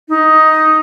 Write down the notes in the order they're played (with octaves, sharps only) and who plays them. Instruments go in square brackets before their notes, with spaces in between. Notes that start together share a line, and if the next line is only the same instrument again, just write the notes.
[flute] D#4